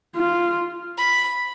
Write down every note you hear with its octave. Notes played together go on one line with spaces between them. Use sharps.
F4
B5